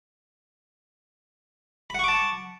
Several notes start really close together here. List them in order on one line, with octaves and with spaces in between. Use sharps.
B5 F#5 C#6 D6 A5